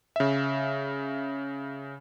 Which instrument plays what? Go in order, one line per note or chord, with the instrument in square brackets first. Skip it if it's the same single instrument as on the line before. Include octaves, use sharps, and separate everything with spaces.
[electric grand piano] C#3 E5